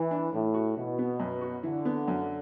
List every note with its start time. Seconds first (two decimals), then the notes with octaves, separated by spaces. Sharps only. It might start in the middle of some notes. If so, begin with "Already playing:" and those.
Already playing: E3
0.11 D4
0.33 A2 E3
0.54 F#4
0.76 B2 E3
0.99 B3
1.20 F#2
1.41 F#4
1.63 D3 E3
1.85 B3
2.08 F#2